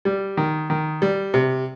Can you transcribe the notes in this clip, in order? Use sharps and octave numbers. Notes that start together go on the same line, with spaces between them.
G3
D#3
D#3
G3
C3